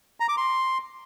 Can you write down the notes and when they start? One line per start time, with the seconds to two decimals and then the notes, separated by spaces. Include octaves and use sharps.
0.20 A#5
0.29 D6
0.37 C6